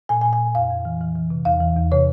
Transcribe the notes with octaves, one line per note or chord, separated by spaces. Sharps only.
A#2 G#5
G#5
A#2
G#5
A#2
F2 F5
F2
E3
E3
E3
C3
E2 F5
E3
E2
C3 C#5